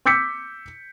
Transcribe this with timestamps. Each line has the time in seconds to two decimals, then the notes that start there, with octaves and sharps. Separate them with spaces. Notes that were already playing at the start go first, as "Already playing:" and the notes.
0.06 D6 E6 G6 B6 C#7